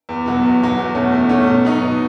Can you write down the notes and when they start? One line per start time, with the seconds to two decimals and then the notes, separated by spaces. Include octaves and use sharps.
0.09 E2
0.26 B2 F#3
0.43 E2
0.60 B2 F#3
0.78 E2
0.95 B2 A3 C#4
1.12 E2
1.29 B2 A3 C#4
1.47 B2
1.65 F#3 B3 D#4
1.81 B2